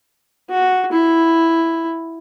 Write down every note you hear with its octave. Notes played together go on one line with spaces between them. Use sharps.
F#4
E4